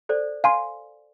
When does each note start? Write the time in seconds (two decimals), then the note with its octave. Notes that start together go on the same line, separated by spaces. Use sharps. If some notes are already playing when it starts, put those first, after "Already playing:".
0.09 A4 C5 D5
0.44 F5 G#5 C6